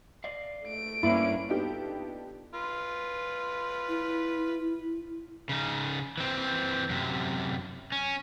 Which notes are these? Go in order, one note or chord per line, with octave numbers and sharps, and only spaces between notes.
D5 D#5 F5
A3 D7
G2 A#3 C#4 D4 E4 B4
B3 D4 D#4 F4 G4 A4
F4 B4
E4
C#3 D#4
E3 C4
F#2 C3
C#4